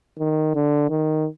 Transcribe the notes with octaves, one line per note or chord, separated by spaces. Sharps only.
D#3
D3
D#3